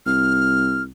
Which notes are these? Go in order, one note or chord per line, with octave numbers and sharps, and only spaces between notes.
C2 F6